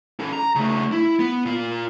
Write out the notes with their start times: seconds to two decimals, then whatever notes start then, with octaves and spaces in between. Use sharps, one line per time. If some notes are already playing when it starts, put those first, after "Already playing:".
0.20 C#4 A4
0.33 A#5
0.56 C#3 A3
0.92 E4
1.19 B3
1.45 A#2 F4